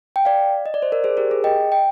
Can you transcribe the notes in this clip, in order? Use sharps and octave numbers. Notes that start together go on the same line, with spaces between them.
G5
D5 F5
D#5
D5
C5
A#4 D5
G#4 C5
G4 A#4
G#4
D#5 G5
G5